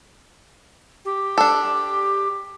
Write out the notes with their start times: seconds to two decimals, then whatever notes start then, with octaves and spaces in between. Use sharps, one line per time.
1.05 G4
1.38 D4 A4